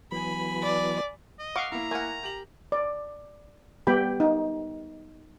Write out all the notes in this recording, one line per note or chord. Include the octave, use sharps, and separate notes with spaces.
E3 F#3 B3 G#5 B5
D5
D#5
F5 F#5 C#6 D6
A#3 E4 A#5
A3 A#4 F#5 G#5
G4 F#7
D5
G3 B3 G4 G5 B5
D#4